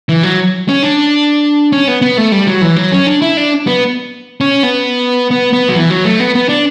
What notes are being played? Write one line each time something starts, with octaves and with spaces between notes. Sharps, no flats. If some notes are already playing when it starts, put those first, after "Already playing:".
E3
F#3
C#4
D4
C#4
B3
B3
A3
G3
F#3
E3
F#3
C#4
D4
E4
D4
B3
C#4
B3
B3
B3
F#3
E3
F#3
A3
B3
B3
D4